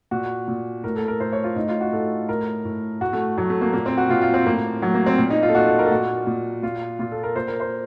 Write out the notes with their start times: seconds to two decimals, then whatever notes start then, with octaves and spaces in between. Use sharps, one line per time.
0.11 A#2 F#4
0.48 A#2
0.84 A2 A#4
0.96 A4
1.08 A#4
1.20 A2 C5
1.32 C#5
1.44 F4
1.56 A2 D#4
1.69 F4
1.81 F#4
1.92 A2 A4
2.29 A2 A#4
2.65 A2
3.01 A2 F#4
3.13 A3
3.38 A2 F#3
3.50 A3
3.61 A#3
3.73 A#2 A#3
3.86 C4
3.97 F#4
4.09 A#2 F4
4.22 F4
4.34 C4
4.46 A2 A#3
4.82 A2 F#3
4.94 A#3
5.06 C4
5.18 A#2
5.30 D#4
5.43 F4
5.49 A4
5.54 A#2 F#4
5.67 A4
5.79 A#4
5.86 A4
5.91 A#2 F#4
6.27 A#2
6.63 A#2 F4
6.99 A#2 F4
7.12 A4
7.23 A#4
7.36 A#2 C5
7.48 A#4
7.60 C5